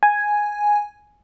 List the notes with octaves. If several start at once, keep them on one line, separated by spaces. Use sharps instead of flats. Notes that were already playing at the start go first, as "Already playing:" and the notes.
G#5